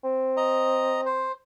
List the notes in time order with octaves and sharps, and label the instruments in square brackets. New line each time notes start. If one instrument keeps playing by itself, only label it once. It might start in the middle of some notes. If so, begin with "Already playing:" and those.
[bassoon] C4
[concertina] D#5 A#5
C5